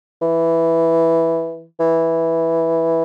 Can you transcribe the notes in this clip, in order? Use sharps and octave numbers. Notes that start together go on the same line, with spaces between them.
E3
E3